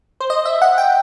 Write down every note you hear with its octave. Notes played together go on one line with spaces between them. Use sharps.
C5
D#5
E5
F#5
G5